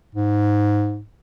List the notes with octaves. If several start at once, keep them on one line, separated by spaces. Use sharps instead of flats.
G#2